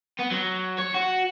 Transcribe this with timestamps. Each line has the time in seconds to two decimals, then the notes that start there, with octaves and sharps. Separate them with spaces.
0.19 B3
0.32 F#3
0.78 C#5
0.94 F#4